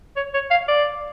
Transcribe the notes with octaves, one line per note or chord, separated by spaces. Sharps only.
C#5
C#5
F5
D5